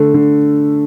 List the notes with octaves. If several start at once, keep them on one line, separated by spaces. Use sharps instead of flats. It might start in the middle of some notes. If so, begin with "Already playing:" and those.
Already playing: D3 A3
D3